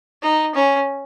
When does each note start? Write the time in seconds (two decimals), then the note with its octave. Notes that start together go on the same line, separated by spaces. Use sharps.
0.22 D#4
0.54 C#4